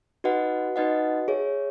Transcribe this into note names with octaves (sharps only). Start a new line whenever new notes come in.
D#4 F#4 B4 D#5 F#5
D#4 F#4 B4 D#5 F#5
G#4 C#5 E5